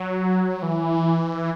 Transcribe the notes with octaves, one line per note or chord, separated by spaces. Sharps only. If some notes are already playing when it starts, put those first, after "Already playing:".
Already playing: F#3
E3